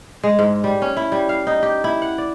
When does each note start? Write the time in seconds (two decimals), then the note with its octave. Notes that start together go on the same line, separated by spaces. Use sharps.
0.23 G#3
0.39 G#2
0.64 G3
0.82 C#4
0.97 E4
1.12 G3
1.29 F5
1.47 D#4
1.63 G4
1.84 E4
2.02 F#5
2.18 D5